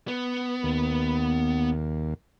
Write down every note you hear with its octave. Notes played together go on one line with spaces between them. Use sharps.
B3
D#2